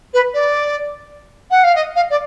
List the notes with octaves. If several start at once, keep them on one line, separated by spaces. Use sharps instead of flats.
B4
D5
F#5
F5
D#5
F5
D5